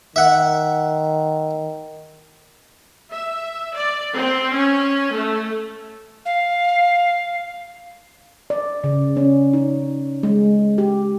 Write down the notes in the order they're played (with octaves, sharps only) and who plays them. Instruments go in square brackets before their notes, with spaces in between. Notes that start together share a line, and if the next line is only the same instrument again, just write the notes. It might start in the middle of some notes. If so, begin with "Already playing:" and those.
[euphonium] D#3 [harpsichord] E5 F#5
[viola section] E5
D5
C4
C#4
A3
[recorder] F5
[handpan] D5
C#3
C#4
D#4
G#3
G4